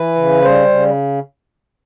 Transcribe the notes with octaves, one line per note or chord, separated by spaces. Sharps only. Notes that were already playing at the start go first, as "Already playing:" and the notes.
Already playing: E3 B4
C#3
G3 C5
C#3